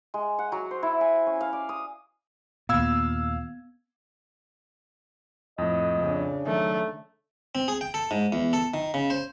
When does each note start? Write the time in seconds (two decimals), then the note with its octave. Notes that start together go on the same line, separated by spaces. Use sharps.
0.14 G#3
0.39 F#5
0.52 F#3
0.71 C5
0.83 E4
1.01 G#5
1.27 C#4
1.41 F5
1.53 D5
1.69 D#6
2.69 D#2 A#2 B3 F5 E6 G#6
5.58 F2 A2 D#5
5.98 C#3 D4
6.47 D#3 F#3 A3
7.55 C4
7.68 G#4
7.81 G5
7.94 A4
8.11 G#2
8.32 E2
8.53 A4
8.74 D#3
8.94 C#3
9.10 C5